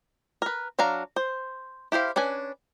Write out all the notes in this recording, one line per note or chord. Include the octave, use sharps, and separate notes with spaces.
A#4 B4
F#3 D4 F5 A#5
C5
E4 G4 C5 F5
C#4 D4 B4 G#5